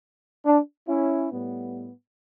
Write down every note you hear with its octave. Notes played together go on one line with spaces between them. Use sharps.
D4
C#4 E4
A2 G3 B3